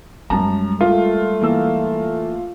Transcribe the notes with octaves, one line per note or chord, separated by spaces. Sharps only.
F#2 G3 G#3 A5 A#5
A3 F4 A#4
E3 A#3 E6